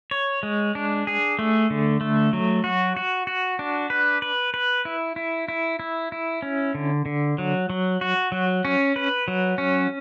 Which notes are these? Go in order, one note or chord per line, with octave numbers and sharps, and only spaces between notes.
C#5
G#3
D4
G#4
A3
D3
A3
F#3
F#4
F#4
F#4
D4
B4
B4
B4
E4
E4
E4
E4
E4
C#4
D3
D3
F#3
F#3
F#4
F#3
C#4
B4
F#3
C#4